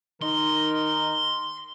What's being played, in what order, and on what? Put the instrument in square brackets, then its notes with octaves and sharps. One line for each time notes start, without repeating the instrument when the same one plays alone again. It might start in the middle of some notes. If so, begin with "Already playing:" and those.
[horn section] D#3 D#4 A#4 [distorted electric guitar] C6